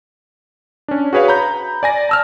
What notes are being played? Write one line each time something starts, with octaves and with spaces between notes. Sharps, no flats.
C#4 D4
F#4 G#4 B4 C#5 F5
A#5 B5 G6
D5 G#5 A#6
A5 E6 F6